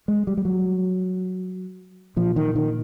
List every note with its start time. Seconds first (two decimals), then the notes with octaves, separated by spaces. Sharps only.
0.08 G#3
0.27 G3
0.37 G3
0.45 F#3
2.16 A#2 F3
2.36 D#3
2.55 D#3